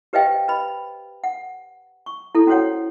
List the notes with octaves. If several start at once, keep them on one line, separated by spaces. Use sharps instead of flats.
G4 B4 C5 D#5 F5 G5
B4 D#5 B5
F#5
C#6
E4 A4
C#4 F#4 A4 C5 C#5 F#5